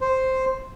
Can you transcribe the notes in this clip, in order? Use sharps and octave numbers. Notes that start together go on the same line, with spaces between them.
C5